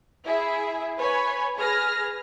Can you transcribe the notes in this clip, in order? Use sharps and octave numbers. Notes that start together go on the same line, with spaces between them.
E4 G#4 E5
B4 C#5 G#5 B5
G#4 B4 F6 A#6